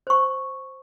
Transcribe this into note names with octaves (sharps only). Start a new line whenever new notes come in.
C5 C#6